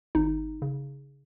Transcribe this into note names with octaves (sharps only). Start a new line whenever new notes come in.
G#1 D#4
C#3